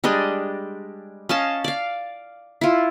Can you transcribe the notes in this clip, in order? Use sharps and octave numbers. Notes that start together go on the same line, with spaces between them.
G3 G#3 D4 D#5
C#4 D#5 F5 A5
D5 F5
E4 F4